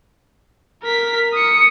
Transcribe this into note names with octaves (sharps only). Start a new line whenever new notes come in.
A#4 B6
D#6 C#7